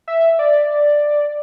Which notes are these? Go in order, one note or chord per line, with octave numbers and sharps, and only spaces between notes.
E5
D5